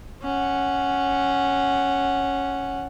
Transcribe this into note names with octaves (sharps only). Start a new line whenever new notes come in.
C#4 F#5